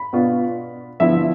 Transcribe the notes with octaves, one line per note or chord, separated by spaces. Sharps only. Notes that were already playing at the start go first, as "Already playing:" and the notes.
Already playing: B5
B2 B3 D4 F4
D3 F3 B3 E4 E5